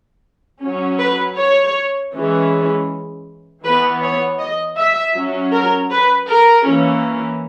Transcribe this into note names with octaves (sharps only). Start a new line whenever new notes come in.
F#3 C#4
B4
C#5
E3 G#3 C#4
E3 B3 B4
C#5
D#5
E5
F#3 C#4
A#4
B4
A#4
E3 A#3 C#4